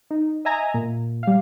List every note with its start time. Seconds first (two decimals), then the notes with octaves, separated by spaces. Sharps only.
0.10 D#4
0.45 D#5 E5 G#5 A#5
0.74 A#2
1.23 G3 F5